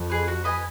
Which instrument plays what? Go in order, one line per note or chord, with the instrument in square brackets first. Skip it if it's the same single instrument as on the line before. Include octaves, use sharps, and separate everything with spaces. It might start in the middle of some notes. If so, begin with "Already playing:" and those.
Already playing: [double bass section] F2
[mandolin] G#4 B4
F#4
B4 D#5 G#5